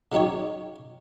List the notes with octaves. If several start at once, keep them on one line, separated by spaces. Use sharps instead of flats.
C#3 F#3 D#4 G4 C#5